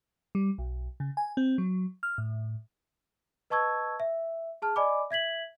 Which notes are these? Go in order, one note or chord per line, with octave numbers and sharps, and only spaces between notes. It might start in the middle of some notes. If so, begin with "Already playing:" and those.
G3
B1
C#3
G#5
C4
F#3
F6
A2
B4 D#5 A5 C#6 E6 G#6
E5
G#4 A5 F6
D5 D#5 G#5 B5 D6
E5 G#6 B6 F#7